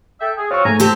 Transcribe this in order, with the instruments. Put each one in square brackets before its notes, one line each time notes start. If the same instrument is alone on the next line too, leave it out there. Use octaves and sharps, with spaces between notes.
[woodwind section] A4 E5 G5
G#4
[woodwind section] C4 F4 F#4 [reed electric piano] C#5 C#6
[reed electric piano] G#2 A3 [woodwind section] G#5 A#5
[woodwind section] C4 [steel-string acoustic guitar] G4 A4